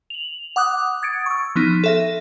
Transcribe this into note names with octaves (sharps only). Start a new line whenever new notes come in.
F7 F#7
F#5 D6 D#6 F#6
D#6 G#6 A6 C#7 D7
C#6 E6
F3 B3 D#4
A4 E5 A#6